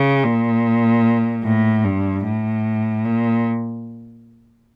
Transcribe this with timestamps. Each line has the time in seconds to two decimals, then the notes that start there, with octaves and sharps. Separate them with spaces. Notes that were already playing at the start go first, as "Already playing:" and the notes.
Already playing: C#3
0.24 A#2
1.44 A2
1.84 G2
2.24 A2
3.04 A#2